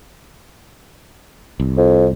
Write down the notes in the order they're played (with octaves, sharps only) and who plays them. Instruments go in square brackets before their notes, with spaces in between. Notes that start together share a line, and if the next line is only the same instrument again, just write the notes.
[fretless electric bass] C2
[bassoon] F2